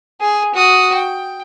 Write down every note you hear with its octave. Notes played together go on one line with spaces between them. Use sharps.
G#4
F#4 D#6
G5